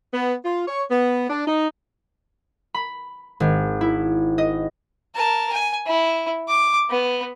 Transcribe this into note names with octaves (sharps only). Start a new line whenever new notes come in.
B3
F4
C#5
B3
D4
D#4
B5
G#1
E4
D#5
A#4 A5
G#5
E4
D6
B3